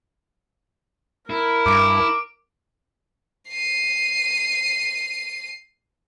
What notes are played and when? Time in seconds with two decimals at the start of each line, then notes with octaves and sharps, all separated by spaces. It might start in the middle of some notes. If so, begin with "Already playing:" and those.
1.30 E4 A#4
1.66 G2 D6 D7
3.50 C7 D#7